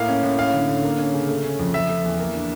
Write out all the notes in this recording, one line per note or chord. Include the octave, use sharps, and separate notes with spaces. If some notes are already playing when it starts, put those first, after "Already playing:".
Already playing: A2 A#3 F5
C#4
A2
C#4 F5
D3
D3
A#3
C#4
C#3
A3
C#4
F2
F3 E5
A3
E2
A#3
D4